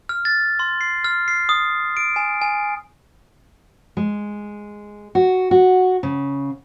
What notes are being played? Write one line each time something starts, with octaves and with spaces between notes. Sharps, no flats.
F6
A6
C6
C7
F6
C7
D#6
D7
G#5
G#5
G#3
F#4
F#4
C#3